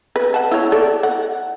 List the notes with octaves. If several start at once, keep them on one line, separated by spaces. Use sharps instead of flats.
B4
F#5 A5
E4 C#5
A4 D5
F#5